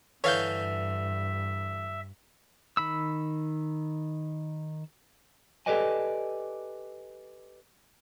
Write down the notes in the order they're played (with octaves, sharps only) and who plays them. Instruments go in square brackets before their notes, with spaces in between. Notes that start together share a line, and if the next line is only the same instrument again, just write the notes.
[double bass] G2 [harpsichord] D3 E3 [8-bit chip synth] C#5 F5 G6 [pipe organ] E5
[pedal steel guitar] D#3 B5 E6
[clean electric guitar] G4 A4 B4 D5 D#5 G#5